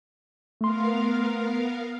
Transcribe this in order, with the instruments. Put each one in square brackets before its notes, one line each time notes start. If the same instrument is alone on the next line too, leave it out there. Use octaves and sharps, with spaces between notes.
[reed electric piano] A3 C6 [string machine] B3 A#4 F5